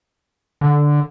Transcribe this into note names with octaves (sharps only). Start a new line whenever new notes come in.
D3